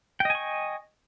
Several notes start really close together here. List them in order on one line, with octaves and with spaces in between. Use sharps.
G5 D#5 G#5 C#6